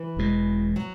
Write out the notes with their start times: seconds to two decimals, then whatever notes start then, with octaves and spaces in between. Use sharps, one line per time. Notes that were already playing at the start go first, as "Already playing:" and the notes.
Already playing: E3
0.17 E1 E2 B2 G#3
0.76 F#3